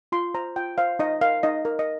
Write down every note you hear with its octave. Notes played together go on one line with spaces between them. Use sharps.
F4 C6
C5 A#5
F4 G5
C5 F5
D#4 D#5
A#4 F5
D#4 D#5
A#4
D#5